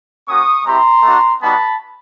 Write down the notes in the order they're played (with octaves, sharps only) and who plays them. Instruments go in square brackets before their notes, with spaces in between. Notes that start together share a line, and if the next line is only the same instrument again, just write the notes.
[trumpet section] A#3 C#4 F#4 C#6 D#6
G#3 C4 E4 G4 A#5 C6
A3 D4 F#4
G3 B3 D#4 F#4 A5 B5